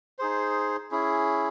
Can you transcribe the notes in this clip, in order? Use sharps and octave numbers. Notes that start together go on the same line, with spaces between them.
D#4 G#4 C5
C#4 E4 G#4